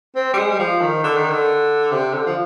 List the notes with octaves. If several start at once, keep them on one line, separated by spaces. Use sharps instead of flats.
C4
G3
G#3
G3
F3
D#3
D3
D#3
D3
C3
D3
F3